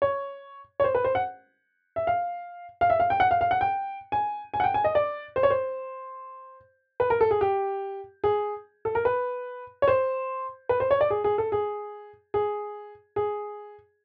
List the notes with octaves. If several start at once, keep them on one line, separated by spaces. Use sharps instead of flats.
C#5
C#5
C5
B4
C5
F#5
E5
F5
F5
E5
F5
G5
F#5
F5
F5
F#5
G5
G#5
G#5
F#5
G5
G#5
D#5
D5
C5
C#5
C5
B4
A#4
A4
G#4
G4
G#4
A4
A#4
B4
C#5
C5
B4
C5
C#5
D5
G#4
G#4
A4
G#4
G#4
G#4